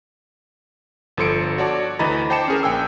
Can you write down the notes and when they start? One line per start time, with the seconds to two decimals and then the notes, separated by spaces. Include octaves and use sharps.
1.17 G1 F3 A4 C6 C#7 D7
1.58 F#4 C#5 D5 A5 D6
1.99 D2 E3 D#5 A#5 B5 A6
2.30 C5 G5 A5 D6 C#7 E7
2.48 C#4 G#4 A#4
2.63 A#1 G5 G#5 E6